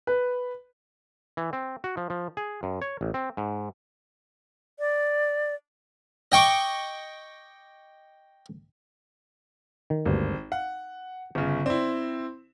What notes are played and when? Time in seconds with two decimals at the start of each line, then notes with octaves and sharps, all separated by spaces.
0.07 B4
1.37 E3
1.53 C4
1.84 F#4
1.97 F3
2.10 F3
2.37 G#4
2.63 F#2
2.82 C#5
3.01 A1
3.14 C4
3.37 G#2
4.79 D5
6.32 D#5 G5 C#6 D6
9.90 D#3
10.05 G#1 D2 G2 A#3
10.52 F5 F#5
11.35 G1 C#3
11.66 C4 E4 D5